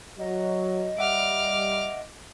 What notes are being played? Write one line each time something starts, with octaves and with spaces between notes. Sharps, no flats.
F#3 D#5
G3 E5 F#5 D6 F6